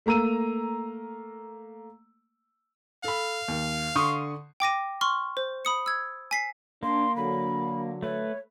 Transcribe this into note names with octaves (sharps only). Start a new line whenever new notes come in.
A3 A#3 A#5 E6 D#7
A4 F5 B5
D#2
D3 C6 C#6 D#6
G5 D6 A#6 D#7
C6 C#6 F6
C5
B5 D#6 C#7
E6 G#6
G#5 B6 C7
A#3 D4 C6
D3 F#3 B5
A3 B4 C#5